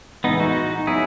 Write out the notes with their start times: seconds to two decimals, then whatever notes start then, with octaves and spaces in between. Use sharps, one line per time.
0.24 A2 E3 G#3 B3 D#4
0.40 D#4 F#4
0.87 F#3 B3 D#4 E4 G#4